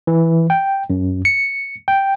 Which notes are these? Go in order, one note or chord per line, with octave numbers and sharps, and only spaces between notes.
E3
G5
F#2
C#7
G5